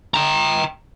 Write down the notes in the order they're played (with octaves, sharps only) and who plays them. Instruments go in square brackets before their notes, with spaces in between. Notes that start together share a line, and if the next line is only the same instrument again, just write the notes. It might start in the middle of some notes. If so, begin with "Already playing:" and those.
[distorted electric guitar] G5 A#5